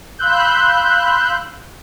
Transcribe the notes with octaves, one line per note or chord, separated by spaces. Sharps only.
F5 B5 C6 E6 F#6 G6